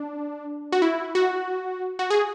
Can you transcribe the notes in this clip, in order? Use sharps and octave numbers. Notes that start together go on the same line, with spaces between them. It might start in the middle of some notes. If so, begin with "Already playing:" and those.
Already playing: D4
F#4
E4
F#4
F#4
G#4